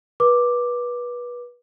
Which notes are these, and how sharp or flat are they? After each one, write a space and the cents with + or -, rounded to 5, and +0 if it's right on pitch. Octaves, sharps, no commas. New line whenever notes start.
B4 -25 D6 +0